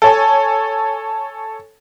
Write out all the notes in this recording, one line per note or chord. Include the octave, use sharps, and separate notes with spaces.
A4 C#5 G#5